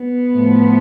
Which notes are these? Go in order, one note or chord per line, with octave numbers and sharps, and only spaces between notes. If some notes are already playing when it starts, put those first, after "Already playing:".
Already playing: B3
A2 F3 A3